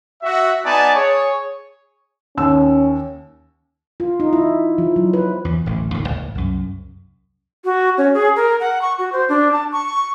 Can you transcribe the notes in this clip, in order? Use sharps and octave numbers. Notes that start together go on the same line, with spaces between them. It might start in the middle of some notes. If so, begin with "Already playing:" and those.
F#4 E5
B3 D#4 D5 G#5 A5
G#4 C#5
D#2 C#4 E6
F4
D#4
E4
F3
F#3
B4
E2
D1 A1
D1 D#2 F3
G#1
C2 F#2
F#4
C#4
G#4
A#4
F#5
C#6
F#4
C5
D4
A5
C#6